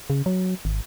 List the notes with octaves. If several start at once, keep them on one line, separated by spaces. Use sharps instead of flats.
C#3
F#3
G#1